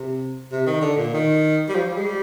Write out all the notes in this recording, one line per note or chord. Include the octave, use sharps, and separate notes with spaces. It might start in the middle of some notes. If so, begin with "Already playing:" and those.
Already playing: C3
C3
D#3
D3
A#2
D#3
G3
F3
G3
G#3
G3